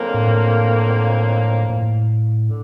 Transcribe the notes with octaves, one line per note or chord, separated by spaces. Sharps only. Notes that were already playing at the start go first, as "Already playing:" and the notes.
Already playing: F2 D3 F#3 A#3
A2
A2
D3